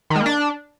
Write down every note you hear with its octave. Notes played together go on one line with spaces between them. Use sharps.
D#3
G#3
A#3
D4